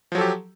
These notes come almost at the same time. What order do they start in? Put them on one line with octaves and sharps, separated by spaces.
F3 F#3 A4 G4